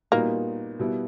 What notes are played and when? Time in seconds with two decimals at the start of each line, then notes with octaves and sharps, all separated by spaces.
0.12 A#2 G3 A#3 B3 D#4 F#4
0.79 B2 G3 B3 E4